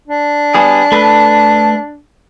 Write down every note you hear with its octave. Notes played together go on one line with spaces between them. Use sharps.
D4
G3 B3 G#4
A3 A4 B4